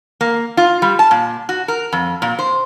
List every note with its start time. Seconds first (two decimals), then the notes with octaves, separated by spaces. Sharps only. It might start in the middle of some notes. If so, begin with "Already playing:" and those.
0.21 A#3
0.57 F4
0.82 G3
0.99 A5
1.11 A#2
1.49 F#4
1.68 A#4
1.92 F2
2.22 A#2
2.39 C5